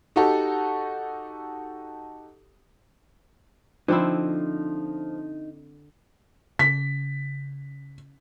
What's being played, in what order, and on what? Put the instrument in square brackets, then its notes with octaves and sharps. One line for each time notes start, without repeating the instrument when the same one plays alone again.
[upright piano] D#4 F#4 G4 A4
[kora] D3 C4 E4 [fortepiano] F3 [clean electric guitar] D#4
[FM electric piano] C#3 [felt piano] B6